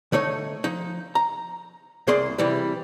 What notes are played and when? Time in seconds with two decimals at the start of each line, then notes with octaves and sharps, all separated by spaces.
0.12 D3 A3 D#4 C#5
0.64 F3 D#4
1.15 A#5
2.07 C2 A#3 G#4 D5 C6
2.38 C3 E3 G3